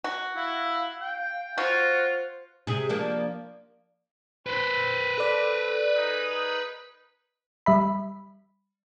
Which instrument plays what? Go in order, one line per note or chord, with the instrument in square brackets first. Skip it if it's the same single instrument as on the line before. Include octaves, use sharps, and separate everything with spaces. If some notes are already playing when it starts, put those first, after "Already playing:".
[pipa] F#4
[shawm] E4 [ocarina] F5
[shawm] G5
[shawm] F4 [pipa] F#4 [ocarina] C5
[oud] C3 G#4
F3 A#3 D4
[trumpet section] C4 B5 [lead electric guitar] B4 C5
[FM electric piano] A4 D5
[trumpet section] D#4 G#4
[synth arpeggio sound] G3 E5 B5